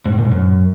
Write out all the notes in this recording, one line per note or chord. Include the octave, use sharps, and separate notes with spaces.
G#2
A2
A#2
G#2
F#2